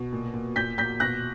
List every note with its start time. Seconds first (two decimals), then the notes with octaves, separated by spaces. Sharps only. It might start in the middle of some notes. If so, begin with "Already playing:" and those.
Already playing: B2
0.13 A#2
0.34 A#2
0.56 A#2 G6 B6
0.78 A#2 G6 B6
1.00 B2 F#6 A#6